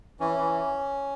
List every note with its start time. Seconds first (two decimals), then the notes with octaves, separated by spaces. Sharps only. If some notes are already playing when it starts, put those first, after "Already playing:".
0.20 E3 C#4
0.38 E3